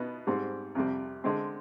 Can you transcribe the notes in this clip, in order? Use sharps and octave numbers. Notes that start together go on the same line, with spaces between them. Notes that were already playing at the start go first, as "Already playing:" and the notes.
Already playing: B2 B3 D#4
G#2 G3 C4
F2 C3 G3
D3 G#3 C4